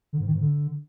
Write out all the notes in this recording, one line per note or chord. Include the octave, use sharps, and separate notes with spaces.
D3
G#2
D#3
G#2
D3